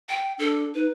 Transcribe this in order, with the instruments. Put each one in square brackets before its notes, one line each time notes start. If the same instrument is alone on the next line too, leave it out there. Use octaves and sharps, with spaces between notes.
[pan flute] G5
[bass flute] D4 [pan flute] A4
[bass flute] D#4 [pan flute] B4